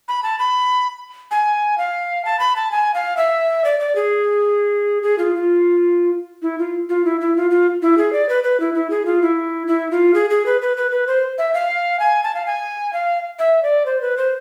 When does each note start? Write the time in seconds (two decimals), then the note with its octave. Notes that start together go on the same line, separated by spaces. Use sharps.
0.08 B5
0.23 A5
0.39 B5
1.31 G#5
1.78 F5
2.25 A5
2.39 B5
2.56 A5
2.71 G#5
2.94 F5
3.17 E5
3.65 D5
3.80 D5
3.96 G#4
5.03 G#4
5.19 F4
5.35 F4
6.42 E4
6.59 F4
6.89 F4
7.05 E4
7.21 E4
7.36 F4
7.51 F4
7.82 E4
7.98 G#4
8.13 D5
8.29 B4
8.44 B4
8.60 E4
8.74 E4
8.90 G#4
9.05 F4
9.22 E4
9.67 E4
9.91 F4
10.14 G#4
10.30 G#4
10.46 B4
10.61 B4
10.77 B4
10.91 B4
11.07 C5
11.38 E5
11.54 F5
12.00 G#5
12.24 A5
12.35 F5
12.46 G#5
12.93 F5
13.39 E5
13.63 D5
13.86 C5
14.01 B4
14.17 C5